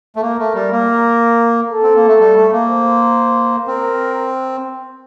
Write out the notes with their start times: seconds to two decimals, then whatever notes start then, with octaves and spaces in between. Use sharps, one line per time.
0.16 A3
0.22 A#3 A#4
0.38 A3
0.55 G3
0.72 A#3
1.70 A4
1.83 C4
1.95 A#3
2.07 A3
2.20 G3
2.36 A3
2.52 A#3
2.69 C5
3.68 C4 A#4